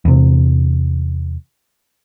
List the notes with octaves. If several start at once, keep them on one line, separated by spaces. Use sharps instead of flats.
E2 C3